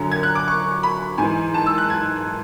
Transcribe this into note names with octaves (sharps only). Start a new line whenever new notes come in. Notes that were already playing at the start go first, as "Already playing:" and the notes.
Already playing: F#2 D3 F#3
G#6
F#6
D6
C#6
B5
G#2 E3 G#5
A5
E6
F#6
G#6